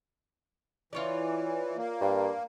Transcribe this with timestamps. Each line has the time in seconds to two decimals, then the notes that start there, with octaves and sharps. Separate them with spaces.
0.93 E3 F4 C#5 D5
1.77 A#3
2.01 G2